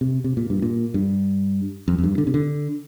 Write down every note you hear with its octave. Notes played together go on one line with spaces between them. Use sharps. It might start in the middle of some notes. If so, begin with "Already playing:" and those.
C3
C3
A#2
G2
A#2
G2
F2
F2
G2
D3
C3
D3